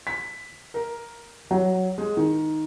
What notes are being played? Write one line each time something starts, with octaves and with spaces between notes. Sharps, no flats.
B6
A#4
F#3
G#3
D#3